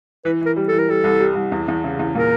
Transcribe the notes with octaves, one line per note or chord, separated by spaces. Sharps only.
E3 B4
E3 A#4
G3
E3 A4
A#4
G3 A4
C2
G3
C2
E2
E2
C#3
E2
A#2 A#4